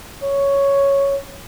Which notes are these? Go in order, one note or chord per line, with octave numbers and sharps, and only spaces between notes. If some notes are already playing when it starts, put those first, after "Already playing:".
C#5